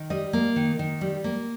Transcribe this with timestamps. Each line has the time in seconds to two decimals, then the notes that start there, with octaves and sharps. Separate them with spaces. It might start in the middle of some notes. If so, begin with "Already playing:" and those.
Already playing: D#3
0.10 G3 D#5
0.33 A#3
0.56 D#3
0.79 D#3
1.01 G3
1.24 A#3